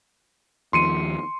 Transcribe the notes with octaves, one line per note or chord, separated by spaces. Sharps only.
D#2 D#3 F3 C6 C#7 D#7